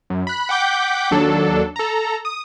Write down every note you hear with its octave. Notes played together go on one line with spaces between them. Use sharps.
F#2
B5 F#6
F#5 G5 D6 G6 B6
D#2 F#3 D4 A4
A4 A#5
D#6